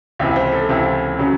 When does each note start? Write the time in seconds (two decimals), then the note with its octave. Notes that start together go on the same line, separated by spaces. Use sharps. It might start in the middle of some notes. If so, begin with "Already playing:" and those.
0.19 C#2 C3 E3 C4
0.36 C5
0.52 A4
0.69 C#2 C3 E3 C4
1.18 C#3 F#3 C#4